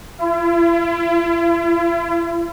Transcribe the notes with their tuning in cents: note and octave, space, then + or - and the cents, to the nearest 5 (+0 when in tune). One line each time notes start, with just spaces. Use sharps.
E4 +45